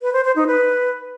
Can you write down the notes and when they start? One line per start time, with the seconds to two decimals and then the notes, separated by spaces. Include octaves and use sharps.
0.02 B4
0.13 C5
0.24 C5
0.36 D#4
0.47 B4